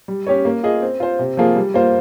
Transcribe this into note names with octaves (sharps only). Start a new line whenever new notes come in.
G3
C#4 G4 C#5
A#3
F4 G#4 D#5
C4
F4 C5
C3
F3 A#3 F4 G#4
G3
A#3 F4 C5